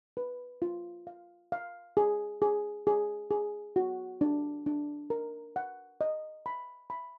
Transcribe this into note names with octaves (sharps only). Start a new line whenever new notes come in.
B4
F4
F5
F5
G#4
G#4
G#4
G#4
F#4
D4
D4
A#4
F#5
D#5
B5
B5